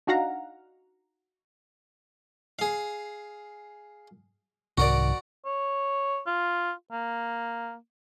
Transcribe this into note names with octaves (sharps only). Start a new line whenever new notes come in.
D4 D#4 F#4 F5 F#5 A#5
G#4 F5
C2 G#2 D#3 F#4 A#4 D5
C#5
F4
A#3